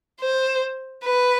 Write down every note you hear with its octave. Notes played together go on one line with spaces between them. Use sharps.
C5
B4